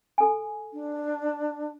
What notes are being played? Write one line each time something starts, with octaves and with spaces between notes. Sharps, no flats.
A4 G#5
D4